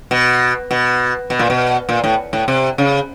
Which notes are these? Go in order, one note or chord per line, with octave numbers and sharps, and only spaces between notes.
B2
B2
B2
A#2
B2
A#2
A2
A2
C3
C#3